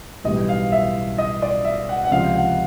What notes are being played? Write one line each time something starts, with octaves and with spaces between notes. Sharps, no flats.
B1 A2 E3 G3 D#5
F5
E5
D#5
D5
E5
F#5
F#5
C#2 C3 F3 F5
F#5